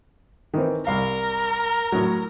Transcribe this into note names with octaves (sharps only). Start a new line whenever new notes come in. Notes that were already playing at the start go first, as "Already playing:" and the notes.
D#3 E3 C4
C2 A#4 F5
A2 F#3